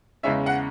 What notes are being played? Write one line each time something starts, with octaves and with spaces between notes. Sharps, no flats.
E2 C#3 G#3 C#4 E5
F#5